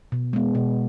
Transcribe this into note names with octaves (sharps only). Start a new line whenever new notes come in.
B2
G#3 B3
B2